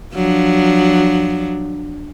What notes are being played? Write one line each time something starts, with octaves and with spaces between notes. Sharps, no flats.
F3 F#3 D4